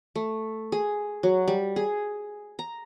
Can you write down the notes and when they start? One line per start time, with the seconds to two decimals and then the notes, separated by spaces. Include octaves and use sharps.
0.15 A3
0.72 G#4
1.23 F#3
1.48 G3
1.76 G#4
2.59 A#5